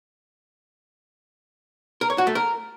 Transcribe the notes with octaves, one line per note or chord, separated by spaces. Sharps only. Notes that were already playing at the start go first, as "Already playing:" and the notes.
A#4
C#5
F#4
A3
A#4